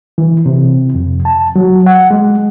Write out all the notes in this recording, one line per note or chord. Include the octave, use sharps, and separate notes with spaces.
E3
C3
F2
A5
F#3
F#5
G#3